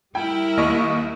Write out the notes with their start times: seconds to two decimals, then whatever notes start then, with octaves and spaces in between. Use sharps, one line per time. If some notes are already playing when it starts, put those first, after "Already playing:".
0.15 G3 E4 A#4 G5
0.57 D#2 D#5 C#6